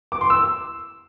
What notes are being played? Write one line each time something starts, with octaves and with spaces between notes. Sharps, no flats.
D6
C6
E6